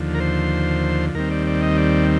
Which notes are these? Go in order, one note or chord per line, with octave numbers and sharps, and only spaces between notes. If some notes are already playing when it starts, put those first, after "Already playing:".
Already playing: D#2 D3 F3
A#4
C5
D#2 D#3 G3 C4 A#4
D5
D5
D#5
D5